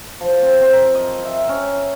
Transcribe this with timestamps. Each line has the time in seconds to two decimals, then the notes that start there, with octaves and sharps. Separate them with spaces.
0.20 F3
0.43 C4
0.61 C4
0.73 A#4
0.95 D#5
1.25 E5
1.49 C#4